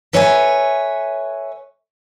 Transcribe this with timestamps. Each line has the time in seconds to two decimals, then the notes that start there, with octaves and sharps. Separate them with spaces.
0.13 A4 B4 C#5 E5 F#5 G#5